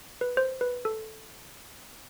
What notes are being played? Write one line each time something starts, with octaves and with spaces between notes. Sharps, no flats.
B4
C5
B4
A4